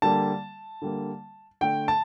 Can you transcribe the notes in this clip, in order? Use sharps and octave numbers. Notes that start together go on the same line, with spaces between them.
D3 G3 A#3 A5
D3 G3 A#3
D3 A3 G5
A5